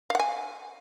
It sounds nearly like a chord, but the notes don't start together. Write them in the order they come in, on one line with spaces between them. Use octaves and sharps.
F5 F#5 G#5